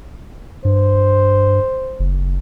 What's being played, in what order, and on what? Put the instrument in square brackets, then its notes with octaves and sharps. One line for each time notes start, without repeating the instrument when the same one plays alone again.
[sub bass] G2 [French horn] C5
[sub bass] F#1